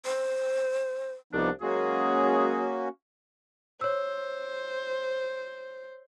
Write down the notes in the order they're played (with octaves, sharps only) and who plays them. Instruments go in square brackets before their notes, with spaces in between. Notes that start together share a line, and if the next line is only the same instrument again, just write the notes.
[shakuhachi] C5
[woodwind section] C2 D4 [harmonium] F3 B3 D#4
[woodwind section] F#3 G#3 G#4 [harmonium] A#3 C#4 F#4
[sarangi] C5 [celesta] C#5 E6